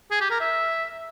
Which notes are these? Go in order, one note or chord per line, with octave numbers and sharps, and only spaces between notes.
G#4
G4
A#4
E5